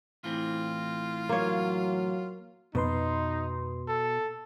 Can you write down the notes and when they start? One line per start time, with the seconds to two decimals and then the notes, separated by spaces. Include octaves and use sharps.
0.24 A2 E3 C4 F4
1.29 F#3 A#3 C#5
2.75 F2 B2 D#4 B4 C6
3.88 A4